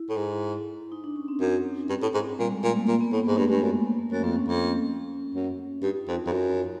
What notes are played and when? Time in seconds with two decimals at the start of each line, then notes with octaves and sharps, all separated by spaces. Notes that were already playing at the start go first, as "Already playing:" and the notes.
Already playing: E4
0.09 A2
0.17 G#2
0.92 D#4
1.04 D4
1.16 C#4
1.28 C4
1.41 F#2
1.90 G2
2.02 A2
2.14 G#2
2.39 A#2 G3
2.52 G#3
2.64 A#2 A3
2.76 A#3
2.88 A#2 A#3
3.01 B3
3.12 A2 A#3
3.25 G#2 A#3
3.37 G2 A3
3.50 G2 G#3
3.62 F#2 A#3
3.74 B3
3.87 A#3
3.99 A3
4.11 F#2
4.24 F2 C4
4.36 C#4
4.48 F2
5.34 F#2
5.83 G2 D#4
5.96 F4
6.08 F2 F4
6.20 F#4
6.27 F2
6.32 F#2 F#4